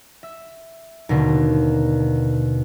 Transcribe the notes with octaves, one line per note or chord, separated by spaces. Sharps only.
E5
D#2 B2 D3